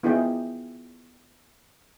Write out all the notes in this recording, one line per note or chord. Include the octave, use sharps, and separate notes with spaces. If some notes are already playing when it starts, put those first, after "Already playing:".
B3 E4 F4 G#4 D#5 G5